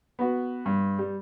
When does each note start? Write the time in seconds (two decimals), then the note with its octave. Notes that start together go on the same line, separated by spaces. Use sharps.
0.19 B3 F#4
0.66 G2
0.99 G3